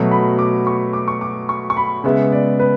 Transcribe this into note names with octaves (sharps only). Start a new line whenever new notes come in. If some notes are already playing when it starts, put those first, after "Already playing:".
Already playing: B2 F#3 A3
B5
D6
C#6
D6
C#6
D6
C#6
C#6
B5
C#3 G#3 B3 E5
D5
B4